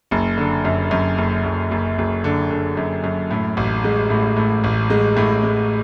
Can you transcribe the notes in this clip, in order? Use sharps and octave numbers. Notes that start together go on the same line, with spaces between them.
F#1
D3
F#2
F#2
F#1
F#1
F#1
F#1
D3
D3
F#2
F#2
A2
A1
G#3
A2
A2
A1
G#3
A2
G#3